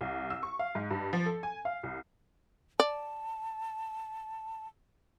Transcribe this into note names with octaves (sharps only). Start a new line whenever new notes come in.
C2
E6
C#6
F5
G#2
G2
F3
A4
G#5
F5
C2
D5 A5